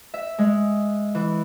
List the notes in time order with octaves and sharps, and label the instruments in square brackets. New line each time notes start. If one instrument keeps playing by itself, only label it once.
[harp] E5
G#3
E3